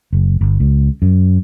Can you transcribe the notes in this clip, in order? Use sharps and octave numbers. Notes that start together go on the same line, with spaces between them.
F#1
G1
C#2
F#2